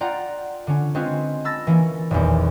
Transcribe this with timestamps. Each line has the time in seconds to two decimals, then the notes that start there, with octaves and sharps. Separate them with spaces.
0.01 F4 D5 F#5 G5 A#5
0.67 D3 C#4
0.95 G#3 C4 C#4 F4 G#4 B4
1.44 A5 B5 E6 A6 A#6
1.67 E3 A#3 C#4
2.11 D#1 B1 E2